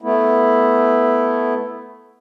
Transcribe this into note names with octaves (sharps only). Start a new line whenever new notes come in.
A3 B3 E4